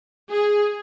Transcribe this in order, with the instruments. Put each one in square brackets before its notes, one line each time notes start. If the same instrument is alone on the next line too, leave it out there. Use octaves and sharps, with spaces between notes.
[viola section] G#4